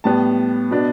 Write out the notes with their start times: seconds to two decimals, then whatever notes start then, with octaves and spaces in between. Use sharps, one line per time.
0.04 A2 G3 B3 A5
0.71 B2 B3 D4